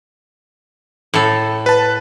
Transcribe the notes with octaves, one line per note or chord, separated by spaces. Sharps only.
A2 A4
B4 A5